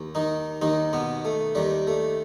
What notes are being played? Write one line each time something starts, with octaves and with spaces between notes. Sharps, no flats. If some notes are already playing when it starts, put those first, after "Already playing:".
Already playing: D#2
D#3 D#4
D#2 D#3 D#4
B2 B3
A3
D#2 D#3 G3
A3